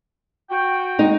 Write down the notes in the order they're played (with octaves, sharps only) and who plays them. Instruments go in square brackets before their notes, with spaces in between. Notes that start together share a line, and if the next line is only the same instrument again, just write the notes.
[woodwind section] F#4 G5
[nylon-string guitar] G#3 D#4